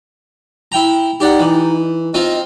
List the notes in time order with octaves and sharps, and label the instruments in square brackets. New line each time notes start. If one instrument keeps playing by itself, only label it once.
[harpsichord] E4 G5 A#5
[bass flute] D#4 [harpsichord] G4 D5 F#5
[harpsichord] E3
[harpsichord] C4 D#4 F4 [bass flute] D#5